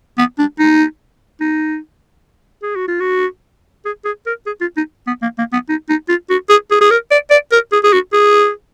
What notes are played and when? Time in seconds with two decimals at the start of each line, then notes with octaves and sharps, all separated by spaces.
0.18 B3
0.39 D4
0.59 D#4
1.41 D#4
2.63 G#4
2.76 F#4
2.88 F4
3.01 F#4
3.86 G#4
4.05 G#4
4.27 A#4
4.47 G#4
4.61 F4
4.77 D#4
5.07 B3
5.22 A#3
5.39 A#3
5.53 B3
5.69 D#4
5.89 D#4
6.09 F4
6.30 F#4
6.50 G#4
6.71 G#4
6.81 G#4
6.91 A#4
7.11 D5
7.31 D5
7.52 A#4
7.72 G#4
7.84 G#4
7.93 F#4
8.13 G#4